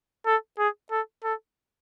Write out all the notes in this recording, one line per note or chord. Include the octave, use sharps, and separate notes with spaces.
A4
G#4
A4
A4